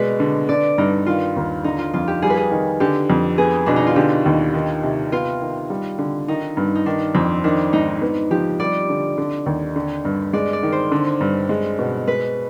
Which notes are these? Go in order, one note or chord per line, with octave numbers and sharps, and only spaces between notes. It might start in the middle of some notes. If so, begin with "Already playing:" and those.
Already playing: B2 G#3 B4 D5
D3
D3 D5
G2 D#4
D#3 F4
D#2
D3 D#4
F4
F2 F4
G4
G3 G#4
B4
G#4
D#3
D3 G4
F2
B3 G#4
B2 D4
D#4
F4
D3 G4
D#2
D#3
C3
B3 F4
D#3
G3
D3
D#3 D#4
G2
D#4
D#3 D4
F2 C4
D#3 D4
G#2 D#4
B3
F3 G4
G3 D5
D3
D3
D#2
D3
G2
G#3 D5
D5
D#3
C5
D3
G2
G#3
B2
G#3 B4